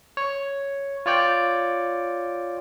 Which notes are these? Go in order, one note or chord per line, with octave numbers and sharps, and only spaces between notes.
C#5
F4 C#5 D5 G5